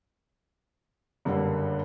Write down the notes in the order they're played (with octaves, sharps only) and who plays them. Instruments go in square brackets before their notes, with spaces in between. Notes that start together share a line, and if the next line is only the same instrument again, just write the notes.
[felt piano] F#1 G2 D3 G3 A#3 F#5